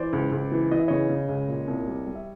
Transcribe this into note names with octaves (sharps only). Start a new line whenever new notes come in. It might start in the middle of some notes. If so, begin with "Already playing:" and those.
Already playing: E3 C5 D5
C#2
C#2
E3
E3 D#5
E5
C#3 C#5 D#5
C#3
C#2
A#2
C2
G3
G3
E5